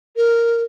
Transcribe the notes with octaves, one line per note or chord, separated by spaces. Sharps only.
A#4